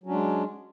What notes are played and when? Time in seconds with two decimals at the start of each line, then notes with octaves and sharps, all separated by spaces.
0.04 F#3
0.06 C#4
0.09 D4
0.12 G#3